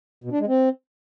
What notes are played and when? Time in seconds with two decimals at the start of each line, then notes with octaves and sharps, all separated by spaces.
0.24 B2
0.32 D4
0.40 G#3
0.48 C4